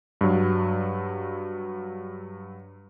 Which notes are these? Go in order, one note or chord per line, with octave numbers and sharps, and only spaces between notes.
G2 F#3